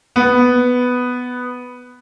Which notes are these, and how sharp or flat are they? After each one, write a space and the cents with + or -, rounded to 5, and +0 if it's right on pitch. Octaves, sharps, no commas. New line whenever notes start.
B3 +5